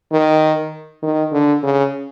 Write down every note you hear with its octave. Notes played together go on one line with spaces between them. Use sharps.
D#3
D#3
D3
C#3